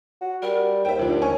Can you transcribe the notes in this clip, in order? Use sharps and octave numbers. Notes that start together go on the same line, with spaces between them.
F#4
G3 A#4
D#2 C5 E5 G5
D2 F3 D4
C#4 G#5 C#6